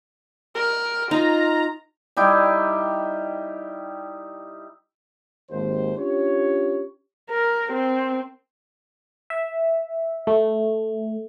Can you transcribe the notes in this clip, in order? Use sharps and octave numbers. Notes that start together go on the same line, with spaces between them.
A#4
D#4 F4 A#5
G3 D#4 E4 G5
G#1 D#2 C5
C#4 D4 F4 G4 C#5
A#4
C4
E5
A3